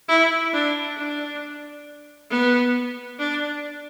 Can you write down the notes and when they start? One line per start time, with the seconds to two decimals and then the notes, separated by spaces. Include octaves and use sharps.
0.09 E4
0.53 D4
0.98 D4
2.30 B3
3.19 D4